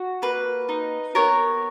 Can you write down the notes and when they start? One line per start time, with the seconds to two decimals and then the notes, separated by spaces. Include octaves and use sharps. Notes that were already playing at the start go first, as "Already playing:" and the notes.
Already playing: F#4
0.22 A#3 B4
0.69 D#4
1.15 B3 A#4 C#5